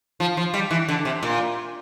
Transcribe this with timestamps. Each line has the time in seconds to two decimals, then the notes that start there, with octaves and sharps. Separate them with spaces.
0.20 F3
0.37 F3
0.54 G3
0.71 E3
0.88 D3
1.05 C3
1.23 A#2